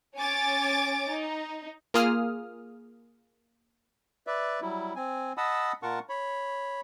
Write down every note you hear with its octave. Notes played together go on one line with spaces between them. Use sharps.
C#4 C#5 G#5 D6 A6 D7
D#4
A#3 F4 G#4 D#6 F6
B4 D5 E5
F#3 G3 E4
C4 G#5
D#5 F#5 A5 B5 D#6 E6
A#2 F4 A#4 F#5 A5 C#6
C#5 B5